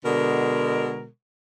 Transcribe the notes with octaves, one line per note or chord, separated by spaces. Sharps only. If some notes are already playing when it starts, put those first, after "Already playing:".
B2 D3 G#3 A#4